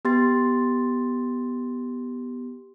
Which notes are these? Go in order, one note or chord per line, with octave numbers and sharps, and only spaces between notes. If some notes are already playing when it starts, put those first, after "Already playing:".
B3 G4 C6 A6